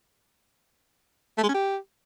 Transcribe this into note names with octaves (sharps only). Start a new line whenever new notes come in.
A3
G#3
C#4
G4